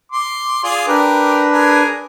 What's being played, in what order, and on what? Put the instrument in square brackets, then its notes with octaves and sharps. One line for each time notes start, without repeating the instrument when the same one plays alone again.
[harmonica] C6 D6
F4 G#4 D5
[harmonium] D4 B4 [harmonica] G4 A#4
[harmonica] G#4 A#4 G#5